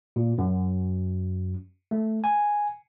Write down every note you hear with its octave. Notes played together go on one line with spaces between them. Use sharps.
A#2
F#2
A3
G#5